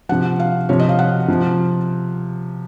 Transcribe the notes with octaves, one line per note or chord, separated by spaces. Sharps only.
C3 F3 F#5
F5
C3 F3 C#5
D#5
F5
F#5
C3 F3